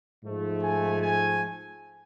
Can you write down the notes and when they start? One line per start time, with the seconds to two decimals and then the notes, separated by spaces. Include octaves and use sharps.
0.23 G#2 F3 A3
0.63 G#5
1.02 G#5